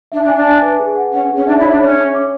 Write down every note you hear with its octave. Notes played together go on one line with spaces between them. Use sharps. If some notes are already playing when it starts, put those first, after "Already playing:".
D4 E5
D4
G#5
D4
G#5
B4
G#4
F#5
C#4 F#5
G#4
C#4
D4 E5
E4
C#5
D4
C#4 C#5
C#5
D6